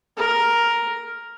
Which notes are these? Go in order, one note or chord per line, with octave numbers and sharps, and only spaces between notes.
A#4